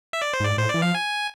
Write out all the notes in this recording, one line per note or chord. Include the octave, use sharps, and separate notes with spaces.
E5
D5
C5
G#2
D5
A2 C5
E3 D5
F3 F5
G#5